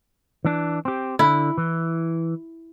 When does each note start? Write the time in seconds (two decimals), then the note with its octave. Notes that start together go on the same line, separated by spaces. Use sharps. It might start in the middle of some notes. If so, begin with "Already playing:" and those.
0.45 E3 D4
0.85 C4 G4
1.19 D3 E4
1.58 E3